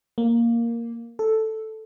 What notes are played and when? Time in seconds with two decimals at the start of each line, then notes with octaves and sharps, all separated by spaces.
0.18 A#3
1.19 A4